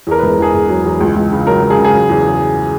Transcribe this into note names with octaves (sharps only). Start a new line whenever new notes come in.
E2 A#4
B4
E1
E2 G#4
E1
F#3
E2
C#2
C#2
C#3
F#3 A#4
F#3
G#4
C#3
G#4
F#3
E2
F#3